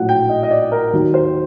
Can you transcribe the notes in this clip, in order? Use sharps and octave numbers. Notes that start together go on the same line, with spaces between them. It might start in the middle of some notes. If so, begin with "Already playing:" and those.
Already playing: A#1 A2 F#3 F#5
G5
D#5
D#5
D5
A#4
D#2 D#3 F#3
C5